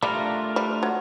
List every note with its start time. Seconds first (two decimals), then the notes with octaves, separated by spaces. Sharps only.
0.02 G3 A3 D4 F4 A#4
0.56 G3
0.83 F#3